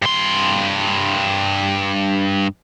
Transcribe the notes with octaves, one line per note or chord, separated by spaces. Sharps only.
G2 C6